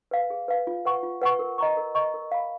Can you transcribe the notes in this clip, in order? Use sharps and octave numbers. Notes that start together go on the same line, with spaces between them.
B4 F5
G#4
B4 F5
F4
B4 F#5 C#6
F4
B4 F#5 C#6
A#4
D#5 A#5 C#6
A#4
D#5 A#5 C#6
A#4
F5 B5